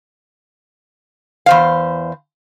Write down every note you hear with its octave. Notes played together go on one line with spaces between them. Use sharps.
E2 C5 F5